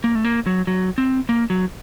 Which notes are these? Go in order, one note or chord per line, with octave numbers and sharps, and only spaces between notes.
A#3
A3
A#3
F#3
F#3
C4
A#3
F#3